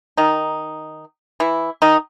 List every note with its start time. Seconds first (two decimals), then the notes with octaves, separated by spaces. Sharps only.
0.17 D#3 D#4
1.40 E3 E4
1.82 D#3 D#4